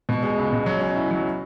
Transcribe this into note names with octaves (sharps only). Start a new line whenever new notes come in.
B2
G#3
C#2
B2
F#3
C#4
E4
F#3